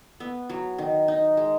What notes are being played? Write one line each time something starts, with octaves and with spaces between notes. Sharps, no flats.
B3
F#3
D#3
D#4
G#3